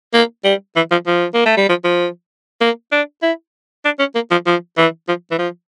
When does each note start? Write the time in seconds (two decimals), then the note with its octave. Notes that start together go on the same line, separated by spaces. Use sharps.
0.13 A#3
0.44 G3
0.76 E3
0.91 F3
1.07 F3
1.34 A#3
1.45 A3
1.57 G3
1.69 F3
1.84 F3
2.61 A#3
2.92 D4
3.22 E4
3.85 D4
3.99 C#4
4.15 A#3
4.31 F3
4.46 F3
4.77 E3
5.08 F3
5.31 E3
5.39 F3